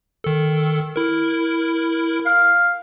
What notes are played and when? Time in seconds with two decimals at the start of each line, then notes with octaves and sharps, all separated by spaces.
0.24 D#3 A4
0.96 E4 A#4
2.26 F5